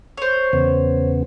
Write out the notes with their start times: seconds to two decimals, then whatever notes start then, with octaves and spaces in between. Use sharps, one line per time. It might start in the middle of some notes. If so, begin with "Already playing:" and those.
0.17 C5 C#5
0.53 E2 C#3 B3